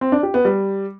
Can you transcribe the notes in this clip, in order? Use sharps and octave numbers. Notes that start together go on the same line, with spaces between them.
C4
D4
G4
B3
G3